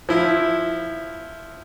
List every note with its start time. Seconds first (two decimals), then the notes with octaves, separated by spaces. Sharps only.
0.09 F3 E4